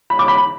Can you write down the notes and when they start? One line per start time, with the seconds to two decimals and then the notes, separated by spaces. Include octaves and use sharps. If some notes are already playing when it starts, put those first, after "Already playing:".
0.10 B5
0.19 D6
0.28 B5